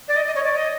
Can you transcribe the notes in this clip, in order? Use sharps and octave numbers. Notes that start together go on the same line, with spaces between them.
D5
D#5
D#5
C#5
D5
D#5